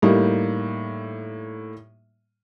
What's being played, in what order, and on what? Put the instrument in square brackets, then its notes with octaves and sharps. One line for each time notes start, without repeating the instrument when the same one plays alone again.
[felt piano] A2 G3 A#3 D#4